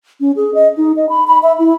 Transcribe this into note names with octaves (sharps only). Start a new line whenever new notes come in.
C#4
G#4
D#5
D#4
D#5
B5
B5
E5
E4